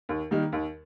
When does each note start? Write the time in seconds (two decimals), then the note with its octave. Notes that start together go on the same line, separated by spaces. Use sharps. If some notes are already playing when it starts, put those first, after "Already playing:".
0.09 D#2
0.31 D#3 G3 A#3
0.52 D#2